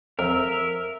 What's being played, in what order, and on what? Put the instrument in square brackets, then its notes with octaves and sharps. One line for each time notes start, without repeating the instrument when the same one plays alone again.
[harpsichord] F2 [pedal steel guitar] A#4 [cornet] E5